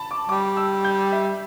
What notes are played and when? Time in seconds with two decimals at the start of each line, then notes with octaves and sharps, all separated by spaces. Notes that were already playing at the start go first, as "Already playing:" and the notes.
Already playing: A5 B5
0.11 D6
0.29 G3 D6
0.57 E6
0.85 G6
1.12 E5